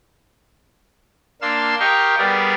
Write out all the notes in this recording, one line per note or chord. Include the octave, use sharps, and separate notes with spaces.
A#3 D4 F5 C6 E6
G4 A#4 D#5 F5 G5 C#6
G3 B3 G4 G#4 A#4 D5